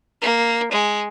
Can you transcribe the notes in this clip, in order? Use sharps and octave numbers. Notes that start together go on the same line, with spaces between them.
A#3
G#3